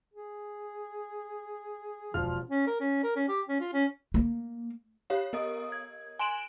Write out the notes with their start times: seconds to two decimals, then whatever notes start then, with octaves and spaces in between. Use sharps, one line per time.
0.14 G#4
2.14 E1 F3 F4 F6
2.49 C#4
2.67 A#4
2.80 C#4
3.03 A#4
3.16 C#4
3.28 G4
3.48 C#4
3.60 F4
3.73 C#4
4.14 A#3
5.10 G4 C#5 F5
5.33 B3 A#4 D#5 D#6
5.72 G#6
6.19 G#5 C6 D7 E7 F#7 G7